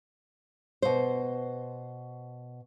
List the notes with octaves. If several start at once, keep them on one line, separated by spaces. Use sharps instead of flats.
B2 C5